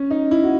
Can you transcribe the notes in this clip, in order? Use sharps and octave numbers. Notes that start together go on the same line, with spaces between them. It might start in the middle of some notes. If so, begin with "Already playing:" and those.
Already playing: C#4
D#4
E4
F#4